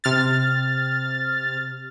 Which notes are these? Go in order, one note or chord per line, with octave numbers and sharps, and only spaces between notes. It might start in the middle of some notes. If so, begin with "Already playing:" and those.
C3 F6 A6